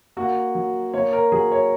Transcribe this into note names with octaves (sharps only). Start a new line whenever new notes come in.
A#3 F#4
F#3
A#3 C#5
A#4
F#3 G#4
C#5